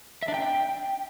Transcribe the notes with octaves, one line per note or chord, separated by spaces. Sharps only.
E5
D4
G5